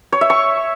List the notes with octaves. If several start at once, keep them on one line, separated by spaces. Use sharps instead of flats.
C#5
E5
C#6